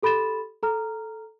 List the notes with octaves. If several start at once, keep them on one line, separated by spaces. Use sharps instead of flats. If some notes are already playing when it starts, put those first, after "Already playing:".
G4 A4 B5 C6 A6 E7
A4 A#5 F6